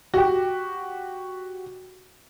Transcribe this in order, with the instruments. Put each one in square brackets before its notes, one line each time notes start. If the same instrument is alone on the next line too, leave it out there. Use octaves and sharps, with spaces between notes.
[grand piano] F#4 G4